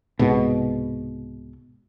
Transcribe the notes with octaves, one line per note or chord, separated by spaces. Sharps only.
C2 G#2 B2